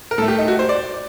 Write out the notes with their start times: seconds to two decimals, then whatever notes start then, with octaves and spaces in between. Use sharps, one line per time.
0.11 A#4
0.18 A2 A4
0.22 A3
0.28 G4
0.38 D#4
0.48 F#4
0.59 C5
0.69 D5